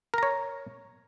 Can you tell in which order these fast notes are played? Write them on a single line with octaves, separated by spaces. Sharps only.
A#4 A#5 C#5